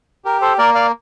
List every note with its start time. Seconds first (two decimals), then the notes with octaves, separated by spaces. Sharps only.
0.25 G4 A#4
0.41 A4 C5
0.58 A#3 A#4 D5
0.75 D5 F5